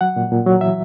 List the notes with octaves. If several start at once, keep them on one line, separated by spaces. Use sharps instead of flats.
F#3 F#5
A#2
A#2
F#3
E3 E5